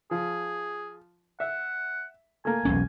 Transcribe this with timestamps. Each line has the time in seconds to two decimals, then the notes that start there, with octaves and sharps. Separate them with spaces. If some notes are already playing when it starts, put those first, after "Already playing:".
0.11 F3 G#4
1.40 E5 F#5
2.45 A3 A#3 G#5
2.65 E1 B1 C#4